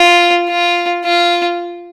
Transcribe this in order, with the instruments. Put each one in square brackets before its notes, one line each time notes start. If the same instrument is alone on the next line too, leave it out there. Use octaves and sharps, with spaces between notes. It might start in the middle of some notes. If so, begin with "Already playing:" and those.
Already playing: [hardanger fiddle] F4
F4
F4